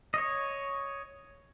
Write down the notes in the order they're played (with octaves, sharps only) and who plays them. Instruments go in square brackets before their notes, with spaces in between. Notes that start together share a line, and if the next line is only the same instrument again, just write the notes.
[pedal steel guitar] C#5 D#5